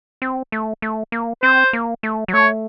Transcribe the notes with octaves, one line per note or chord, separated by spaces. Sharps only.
C4
A3
A3
A#3
C4 C5
A#3
A3
F#3
A3 C#5